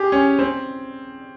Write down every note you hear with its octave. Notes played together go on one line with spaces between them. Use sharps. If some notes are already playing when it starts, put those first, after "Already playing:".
Already playing: G4 G#4
C#4
C4